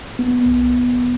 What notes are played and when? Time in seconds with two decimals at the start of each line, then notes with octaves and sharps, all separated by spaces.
0.19 B3
0.46 C2